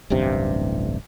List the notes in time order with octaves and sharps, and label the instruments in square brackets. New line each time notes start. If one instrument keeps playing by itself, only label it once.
[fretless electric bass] D1 A1 G2 C3